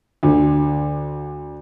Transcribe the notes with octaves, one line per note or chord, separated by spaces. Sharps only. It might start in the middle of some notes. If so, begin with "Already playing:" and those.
D2 D3